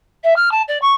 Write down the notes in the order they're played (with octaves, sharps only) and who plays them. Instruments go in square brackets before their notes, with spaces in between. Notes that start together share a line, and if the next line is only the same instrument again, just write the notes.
[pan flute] E5
F6
A5
D5
C#6